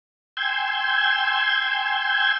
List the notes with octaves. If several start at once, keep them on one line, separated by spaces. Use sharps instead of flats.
G5 G#5 C6 E6 G6 G#6